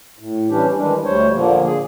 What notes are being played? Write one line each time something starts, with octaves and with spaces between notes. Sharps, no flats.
A2
E3 G3 C#4 D4 G4
D#3 E3 G3 G#3 D4
D2 G3 C5 C#5
A#2 D3 F3 A#3
G#4